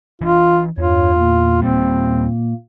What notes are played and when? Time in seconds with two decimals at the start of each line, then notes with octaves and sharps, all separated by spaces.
0.21 E3 D4 F4
0.78 E2 G2 F4 C#5
1.16 A#2 A#3
1.62 D#1 G3 C4